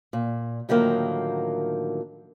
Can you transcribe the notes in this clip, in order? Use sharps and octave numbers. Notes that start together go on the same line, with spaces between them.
A#2
A2 D3 D#3 F3 F#3 A#3